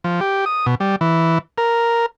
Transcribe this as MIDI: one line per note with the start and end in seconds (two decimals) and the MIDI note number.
0.04 0.20 53
0.21 0.45 67
0.46 0.66 87
0.66 0.75 47
0.80 0.96 55
1.01 1.38 52
1.58 2.06 70